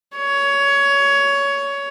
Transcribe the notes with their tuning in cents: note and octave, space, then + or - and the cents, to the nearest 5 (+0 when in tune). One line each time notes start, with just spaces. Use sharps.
C#5 +15